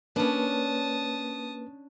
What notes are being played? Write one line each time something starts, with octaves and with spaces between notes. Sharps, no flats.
A#3 C#4 D4 B4 A5 D#6